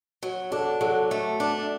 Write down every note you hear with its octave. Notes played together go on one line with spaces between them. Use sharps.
F#3
D4 F#4 A4
F#3 F#4 A4
A3
D4